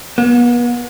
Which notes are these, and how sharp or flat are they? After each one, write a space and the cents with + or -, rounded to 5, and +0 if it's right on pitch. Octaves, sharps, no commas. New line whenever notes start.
B3 -40